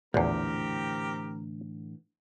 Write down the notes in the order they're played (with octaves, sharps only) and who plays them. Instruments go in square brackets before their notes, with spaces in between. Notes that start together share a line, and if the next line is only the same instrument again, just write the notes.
[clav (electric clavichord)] A#1 E2 [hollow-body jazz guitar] A2 D3 E3 [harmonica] C4 G4 A#4